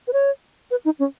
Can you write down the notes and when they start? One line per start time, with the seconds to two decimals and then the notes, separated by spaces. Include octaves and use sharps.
0.08 B4
0.13 C#5
0.71 B4
0.85 D#4
0.99 C#4